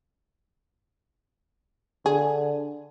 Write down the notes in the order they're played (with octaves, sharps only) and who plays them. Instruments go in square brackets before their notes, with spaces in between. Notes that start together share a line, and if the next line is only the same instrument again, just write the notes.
[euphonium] D3 [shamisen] G#4